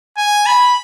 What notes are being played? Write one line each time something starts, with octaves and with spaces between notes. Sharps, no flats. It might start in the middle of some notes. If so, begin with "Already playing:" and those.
G#5
B5